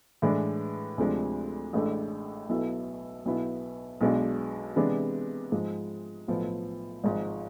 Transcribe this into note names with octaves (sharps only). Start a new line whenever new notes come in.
A2 E3 G#3 D4
D2 C3 F3 G#3 D4
A1 A2 G#3 D4 A4
B1 B2 B3 E4 A4
B1 B2 B3 E4
B1 B2 G#3 D4
C3 E3 G#3 B3 D4
G#2 F3 G#3
B1 A2 F3 B3
G#1 G#2 F3